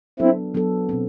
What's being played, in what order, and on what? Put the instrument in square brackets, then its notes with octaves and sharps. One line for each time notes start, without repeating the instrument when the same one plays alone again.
[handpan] F#3 B3 D4 A4 [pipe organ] C4 E4
[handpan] F#3 B3 D4 A4
B2 F#3 C4